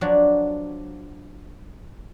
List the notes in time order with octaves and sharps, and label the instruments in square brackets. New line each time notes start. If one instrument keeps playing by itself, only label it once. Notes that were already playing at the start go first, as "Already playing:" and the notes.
[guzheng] F3 F#3 D4 F#4